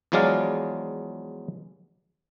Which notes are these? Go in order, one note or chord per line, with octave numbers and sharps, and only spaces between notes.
E2 F3 F#3 G#3 D5 F5